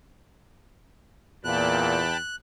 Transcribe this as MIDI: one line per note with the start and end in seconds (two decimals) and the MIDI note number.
1.45 2.18 40
1.45 2.02 46
1.45 2.17 79
1.45 2.17 81
1.45 2.17 83
1.45 2.36 90